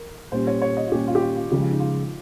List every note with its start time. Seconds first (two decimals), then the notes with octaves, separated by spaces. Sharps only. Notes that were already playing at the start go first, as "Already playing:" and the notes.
Already playing: A#4
0.32 A#2 G3 C#4 C5
0.47 C#5
0.62 C#5
0.77 D#5
0.87 F4
0.92 A#2 G3 C#4 G4
1.07 F4
1.15 G4
1.22 F4
1.36 F4
1.52 C#3 F3 G#3 G4
1.61 F4
1.71 D#4
1.80 F4